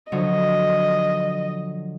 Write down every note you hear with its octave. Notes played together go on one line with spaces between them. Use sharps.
D3 F3 F#3 D#5